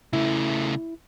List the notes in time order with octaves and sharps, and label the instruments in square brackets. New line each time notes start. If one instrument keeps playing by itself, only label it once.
[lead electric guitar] C#3 A3 [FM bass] E4